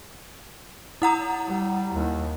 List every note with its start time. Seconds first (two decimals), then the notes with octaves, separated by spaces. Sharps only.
1.02 E4 F#5 A#5
1.47 G3
1.94 D#2